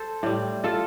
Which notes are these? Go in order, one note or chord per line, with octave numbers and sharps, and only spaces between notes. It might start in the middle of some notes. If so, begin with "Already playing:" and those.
Already playing: A4 C5
A2 G3
F4 A4